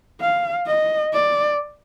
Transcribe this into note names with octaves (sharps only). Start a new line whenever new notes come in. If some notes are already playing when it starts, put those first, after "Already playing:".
F5
D#5
D5